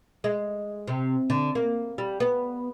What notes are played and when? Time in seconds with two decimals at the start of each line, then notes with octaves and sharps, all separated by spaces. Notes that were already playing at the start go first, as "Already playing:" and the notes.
0.24 G#3
0.88 C3
1.30 D3
1.55 A#3
1.98 G3
2.20 B3